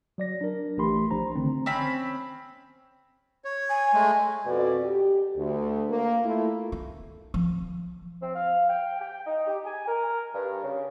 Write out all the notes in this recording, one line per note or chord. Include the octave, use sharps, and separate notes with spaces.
F#3 D5 A#6
D4 A#4
A1 E3 A3 G4 B5 C6
A#1 F3 D4 C5 A#5
D3 D#3 A3 C4
C4 C#4 B5
C#5
G#5
G#3 A3
F2 B2 B3 F#4 A4 D5
G4
D2
A#3
A3 E4 F4
D#4
F3
C4
F5
G5
G5
D#4
G4
G#5
A#4
G2
C#3